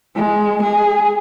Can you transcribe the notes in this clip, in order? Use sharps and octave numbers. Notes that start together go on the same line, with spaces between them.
G#3
G#4